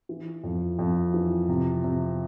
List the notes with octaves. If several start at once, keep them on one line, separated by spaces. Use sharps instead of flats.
E3
F2
F2
E3
C3
C3